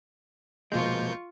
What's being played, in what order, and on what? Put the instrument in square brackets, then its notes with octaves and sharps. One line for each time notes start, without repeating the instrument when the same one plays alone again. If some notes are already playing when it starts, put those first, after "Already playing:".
[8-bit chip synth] B2 A#3 G6 [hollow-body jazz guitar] F3 G#3 [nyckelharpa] F4 C#6